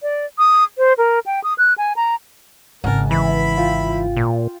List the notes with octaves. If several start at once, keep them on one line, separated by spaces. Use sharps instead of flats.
D5
D#6
C5
A#4
G5
D#6
F#6
G#5
A#5
G#1 C#3 A#4 F#5 G#5 A5
E3 E4 B5
F4 G5
A#2